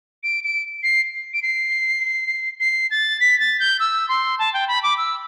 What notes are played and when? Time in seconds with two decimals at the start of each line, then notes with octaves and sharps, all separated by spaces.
0.23 D7
0.44 D7
0.83 C7
1.34 D7
1.42 C7
2.60 C7
2.91 A6
3.20 B6
3.40 A6
3.60 G6
3.80 E6
4.09 C6
4.39 A5
4.54 G5
4.68 B5
4.83 D6
4.97 E6